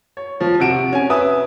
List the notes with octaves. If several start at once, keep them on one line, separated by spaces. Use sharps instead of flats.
C#5
F3
C3 F#4 D7 E7
C#4 G#5
B4 E5 D#6